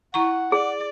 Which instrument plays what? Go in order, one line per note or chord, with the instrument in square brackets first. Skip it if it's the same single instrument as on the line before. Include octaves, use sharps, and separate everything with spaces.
[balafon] E4 A#5 C#6 [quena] F#5
[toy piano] G#4 [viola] D5